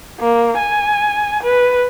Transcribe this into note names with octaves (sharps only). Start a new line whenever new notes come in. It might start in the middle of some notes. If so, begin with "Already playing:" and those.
A#3
G#5
B4